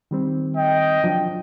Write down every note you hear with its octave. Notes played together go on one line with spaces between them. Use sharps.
D#3 G3 C4
D#5 G5
F3 F#3 D4